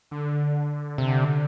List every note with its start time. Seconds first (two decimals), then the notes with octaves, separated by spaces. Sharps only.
0.11 D3
0.98 C3